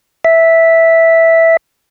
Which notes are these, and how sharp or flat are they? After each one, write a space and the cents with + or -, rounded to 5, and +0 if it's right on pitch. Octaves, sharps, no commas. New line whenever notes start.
E5 -5